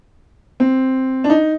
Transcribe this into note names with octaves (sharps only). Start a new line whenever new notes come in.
C4
D4
D#4